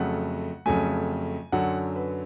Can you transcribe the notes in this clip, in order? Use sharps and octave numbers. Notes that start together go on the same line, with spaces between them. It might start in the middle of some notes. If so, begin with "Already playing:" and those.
Already playing: F2 C#3 F#3 A3 F#5
F2 C#3 F#3 A3 G#5
F#2 D3 F#3 F#5
B4